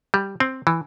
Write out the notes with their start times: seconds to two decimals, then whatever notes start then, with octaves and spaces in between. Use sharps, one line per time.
0.14 G3
0.40 C4
0.67 E3